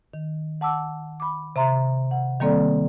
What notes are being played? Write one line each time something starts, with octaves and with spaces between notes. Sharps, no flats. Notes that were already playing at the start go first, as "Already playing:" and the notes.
D#3
F#5 A5 D6 E6
B5 D6
C3 E5 A#5 C6
F#5
D#3 G3 A#3 C4 A4 D5